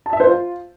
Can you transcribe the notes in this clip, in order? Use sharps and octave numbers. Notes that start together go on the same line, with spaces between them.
A5
E5
C5
F4